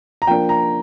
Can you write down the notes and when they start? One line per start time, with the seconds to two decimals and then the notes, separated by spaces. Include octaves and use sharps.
0.22 A#5
0.27 F3 A#3 D4 G5
0.49 A#5